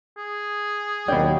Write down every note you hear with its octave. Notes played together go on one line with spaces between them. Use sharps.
G#4
D#2 B2 F#3 C#4 D4 G5